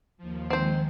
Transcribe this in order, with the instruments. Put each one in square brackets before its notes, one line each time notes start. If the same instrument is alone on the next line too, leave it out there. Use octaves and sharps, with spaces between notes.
[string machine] D#2 F3
[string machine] D#3 G#3 [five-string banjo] C4 C5